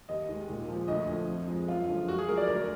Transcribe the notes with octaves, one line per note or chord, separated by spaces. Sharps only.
D#2 D#5
D#3 G#3
A#2
F3 G#3
D2 D#5
D3 F3
F2
F3 G#3
F#2 F4
D3 F3 G#3
F#2 F#4
G#4
G#3 A#4
F3 D5
D2 A#4